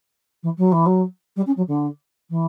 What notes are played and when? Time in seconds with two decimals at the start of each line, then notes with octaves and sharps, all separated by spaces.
0.43 E3
0.57 F#3
0.72 E3
0.85 F#3
1.36 G3
1.46 C#4
1.56 F#3
1.67 D3
2.29 E3